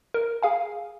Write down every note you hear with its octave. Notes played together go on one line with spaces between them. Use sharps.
A#4
G#4 F5 G#5